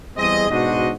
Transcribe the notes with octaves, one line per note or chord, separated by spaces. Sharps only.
E2 G3 C4 G#4 D#5
G#2 B2 D4 F#4 C5 D#5